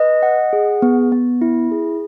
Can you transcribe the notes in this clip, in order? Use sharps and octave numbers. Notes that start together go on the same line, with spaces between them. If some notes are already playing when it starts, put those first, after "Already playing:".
Already playing: B4 D#5
F#5
G#4
B3
B3
E4
G#4